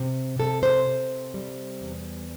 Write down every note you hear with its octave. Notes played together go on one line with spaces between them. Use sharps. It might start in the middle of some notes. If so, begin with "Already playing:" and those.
Already playing: C3
C3 A4
C5
C3
G3
E2